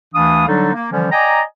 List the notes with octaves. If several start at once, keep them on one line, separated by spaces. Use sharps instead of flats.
D2 E3 D4 F5 D#6
D3 F#3 G3 D4 D#4 A4
A#3
D3 E3 F3 G3 C#4
D5 D#5 G5 G#5 A#5